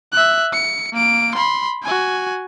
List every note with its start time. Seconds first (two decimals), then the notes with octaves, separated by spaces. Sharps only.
0.12 E5 F#6
0.53 C#7
0.93 A#3 D7
1.35 B5 C6
1.83 F#4 G#5